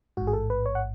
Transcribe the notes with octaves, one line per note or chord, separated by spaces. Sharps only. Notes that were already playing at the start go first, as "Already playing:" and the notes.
A1 G#2 F#4
G#4
A4
B4
C#5
F#5